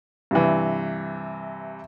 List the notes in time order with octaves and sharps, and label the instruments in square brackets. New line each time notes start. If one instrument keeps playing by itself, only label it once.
[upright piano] G2 C3 E3